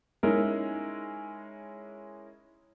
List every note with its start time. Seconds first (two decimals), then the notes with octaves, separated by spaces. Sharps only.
0.23 G#3 C#4 D#4 E4 A#4